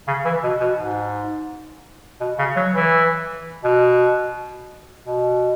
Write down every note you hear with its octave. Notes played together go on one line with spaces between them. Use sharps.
C#3
E3
B2
B2
G#2
B2
C#3
F#3
E3
B2
B2